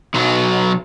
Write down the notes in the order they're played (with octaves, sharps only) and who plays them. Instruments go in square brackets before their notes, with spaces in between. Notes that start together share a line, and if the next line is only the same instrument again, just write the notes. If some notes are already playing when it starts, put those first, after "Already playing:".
[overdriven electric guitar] B1 F#3